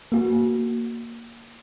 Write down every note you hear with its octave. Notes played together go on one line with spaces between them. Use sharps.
A#3 F#4